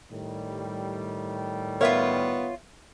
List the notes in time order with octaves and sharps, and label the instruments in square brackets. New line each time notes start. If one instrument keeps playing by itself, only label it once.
[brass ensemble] A2 D#3 G3
[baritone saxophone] B3 [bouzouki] F4 C#5 [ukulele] A#4 E5